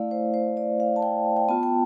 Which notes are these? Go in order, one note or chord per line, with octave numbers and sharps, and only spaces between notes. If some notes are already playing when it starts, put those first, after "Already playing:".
Already playing: A3 E4 D5 F5
C5
C5
D5
F5
A5
G5
G5
B3 F4 A5
G5